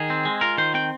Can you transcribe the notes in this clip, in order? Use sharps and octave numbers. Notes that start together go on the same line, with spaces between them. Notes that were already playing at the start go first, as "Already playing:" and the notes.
Already playing: D#3 G#4
C4
G#3
F4 A#4
D#3 C5
C4 G5